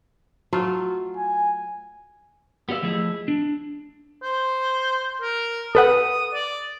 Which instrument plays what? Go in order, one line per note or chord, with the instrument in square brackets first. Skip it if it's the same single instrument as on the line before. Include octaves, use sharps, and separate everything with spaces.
[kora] F#3 A3 F4
[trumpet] G#5
[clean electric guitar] B3 G4 D5 E5 F5
F3 A3 E4 G#4 D#5
D4
[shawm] C5
A#4
[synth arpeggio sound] A4 B4 F#5 [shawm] D#6
[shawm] D5